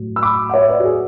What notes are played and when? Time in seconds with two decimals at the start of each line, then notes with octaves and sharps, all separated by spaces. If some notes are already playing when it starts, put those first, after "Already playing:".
Already playing: A2 F#3
0.16 E6
0.22 B5 D6
0.49 F#5
0.54 C#5 E5
0.69 B4 D5
0.79 F#4
0.85 G#4